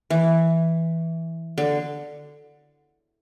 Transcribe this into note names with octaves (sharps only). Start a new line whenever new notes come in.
E3
D3